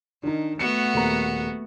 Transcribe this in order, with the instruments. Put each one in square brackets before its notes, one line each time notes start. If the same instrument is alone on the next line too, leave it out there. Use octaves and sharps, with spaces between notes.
[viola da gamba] D#3 [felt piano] D4 D#4
[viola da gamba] A3 B3 F#4 [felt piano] C#7
[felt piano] D#1 A#3 A#5